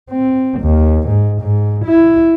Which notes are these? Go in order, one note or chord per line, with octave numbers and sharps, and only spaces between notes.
C4
D#2
G#2
G#2
E4